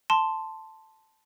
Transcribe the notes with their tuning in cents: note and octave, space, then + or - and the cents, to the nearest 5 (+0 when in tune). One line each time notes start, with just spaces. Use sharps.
A5 +0 C6 +0